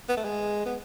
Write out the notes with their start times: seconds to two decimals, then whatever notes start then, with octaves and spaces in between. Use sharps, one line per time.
0.09 B3
0.17 A3
0.25 G#3
0.66 B3